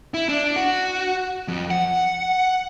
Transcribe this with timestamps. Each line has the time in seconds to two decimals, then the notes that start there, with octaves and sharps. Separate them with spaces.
0.14 E4
0.29 D4
0.56 F#4
1.48 F2
1.70 F#5